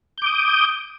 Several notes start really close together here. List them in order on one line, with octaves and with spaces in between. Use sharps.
G6 D6 D#6